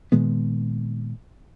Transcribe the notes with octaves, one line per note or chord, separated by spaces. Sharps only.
A#2 D#3 G#3 B3